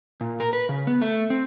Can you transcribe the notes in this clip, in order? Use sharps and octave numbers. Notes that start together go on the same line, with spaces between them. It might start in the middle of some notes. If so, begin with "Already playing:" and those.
A#2
A#4
B4
C#3
B3
A3
C4